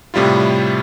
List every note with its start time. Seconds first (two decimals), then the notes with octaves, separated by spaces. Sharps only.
0.14 A2 C3 G3 E4 F4